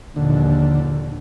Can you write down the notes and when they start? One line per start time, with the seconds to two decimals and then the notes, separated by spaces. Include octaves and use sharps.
0.16 A#1 D#2 D3